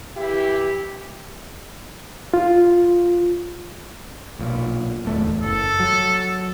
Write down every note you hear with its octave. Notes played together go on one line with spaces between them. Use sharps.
E3 E4 G4
F4
B1 A#2
D1 E2 A3
F#1 A4
F#3